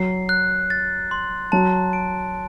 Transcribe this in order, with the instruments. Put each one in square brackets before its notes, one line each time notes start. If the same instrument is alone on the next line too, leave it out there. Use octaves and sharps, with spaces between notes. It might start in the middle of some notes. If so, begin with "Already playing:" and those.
Already playing: [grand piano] F#3 [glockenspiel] C7
[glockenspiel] F#6
A6
C6
[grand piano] F#3 [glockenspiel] A5
[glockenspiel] D7